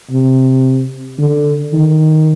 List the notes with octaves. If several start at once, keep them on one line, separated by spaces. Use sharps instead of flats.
C3
D3
D#3